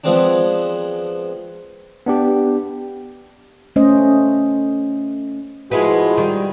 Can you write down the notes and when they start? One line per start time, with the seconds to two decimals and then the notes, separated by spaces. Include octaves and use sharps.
0.04 F3 G#3 B3 C4 D4
2.06 B3 D4 G4
3.76 A3 C#4 C5 D#5
5.71 F3 G#3 E4 F#4 B4
6.17 D#3 G3